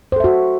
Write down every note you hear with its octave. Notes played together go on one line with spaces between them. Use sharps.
F#4 A4 C5 E5